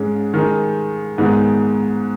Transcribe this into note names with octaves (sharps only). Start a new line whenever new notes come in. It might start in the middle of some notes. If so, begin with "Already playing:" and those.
Already playing: G#2 G#3 C#4
D#3 G#3 D#4
G#2 D#3 G#3 B3 D#4